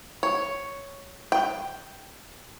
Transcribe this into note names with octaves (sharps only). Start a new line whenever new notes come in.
C#5
G5